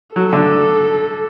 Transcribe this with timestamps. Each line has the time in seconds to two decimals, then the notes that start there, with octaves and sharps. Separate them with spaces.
0.16 F#3 A4
0.33 D3